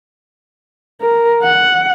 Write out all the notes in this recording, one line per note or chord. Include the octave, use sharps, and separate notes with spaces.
A#4
F#5